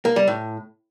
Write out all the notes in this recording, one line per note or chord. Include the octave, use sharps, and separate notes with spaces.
A#3
G3
A2